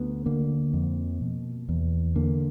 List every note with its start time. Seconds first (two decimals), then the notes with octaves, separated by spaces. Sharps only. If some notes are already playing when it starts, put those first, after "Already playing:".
Already playing: D2 B3
0.26 D3 A#3
0.73 F2
1.21 B2
1.69 E2
2.15 D3 A#3